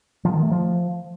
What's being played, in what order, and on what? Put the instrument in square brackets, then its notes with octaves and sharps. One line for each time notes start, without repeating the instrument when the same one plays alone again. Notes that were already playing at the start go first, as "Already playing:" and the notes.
[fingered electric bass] F3
D#3
A3
F3